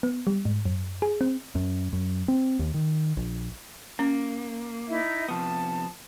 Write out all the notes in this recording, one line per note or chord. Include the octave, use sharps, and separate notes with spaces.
B3
G3
G#2
F#2
G#4
C4
F#2
F#2
C4
D#2
D#3
A#1
A#3 C#4
D#4 E4 E5
C3 F3 B3 A5